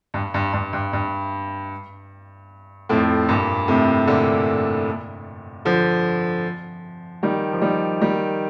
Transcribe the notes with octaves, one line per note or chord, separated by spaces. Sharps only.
G2
G2
G2
G2
G2
F2 A2
G2 A#2
A2 C3
A#2 D3
D3 F3
D#3 G3
F3
D#3 G3
D#3 G3